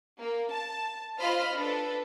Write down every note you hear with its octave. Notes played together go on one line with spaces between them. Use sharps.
A#3
A5
F4 C5 D#5 B5 F6
D4 A4 B4